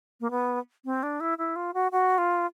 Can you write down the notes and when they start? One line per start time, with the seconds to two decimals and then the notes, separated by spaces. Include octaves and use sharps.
0.21 A#3
0.31 B3
0.85 C4
1.03 D4
1.20 E4
1.38 E4
1.56 F4
1.74 F#4
1.92 F#4
2.18 F4